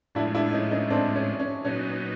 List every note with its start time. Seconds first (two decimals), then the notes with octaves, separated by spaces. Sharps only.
0.15 A2 F3 G#3 D4 E4
0.34 D4 E4
0.53 C#4 D#4
0.71 C#4 D#4
0.90 C4 D4
1.16 C#4
1.39 C#4
1.65 A#2 F#3 B3 C#4 D#4